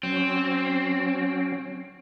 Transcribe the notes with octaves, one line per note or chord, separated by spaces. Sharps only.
F#3 C4 C#4